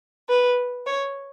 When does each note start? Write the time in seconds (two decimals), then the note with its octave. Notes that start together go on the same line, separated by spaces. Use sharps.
0.29 B4
0.87 C#5